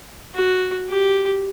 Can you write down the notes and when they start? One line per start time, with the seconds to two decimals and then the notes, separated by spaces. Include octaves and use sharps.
0.35 F#4
0.89 G4